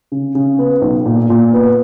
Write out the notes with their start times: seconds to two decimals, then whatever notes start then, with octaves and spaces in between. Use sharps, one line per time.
0.12 C#3
0.35 C#3
0.59 B3
0.82 B1
1.06 A#2
1.30 A#2
1.53 B3